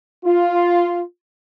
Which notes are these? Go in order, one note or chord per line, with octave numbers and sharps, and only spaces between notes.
F4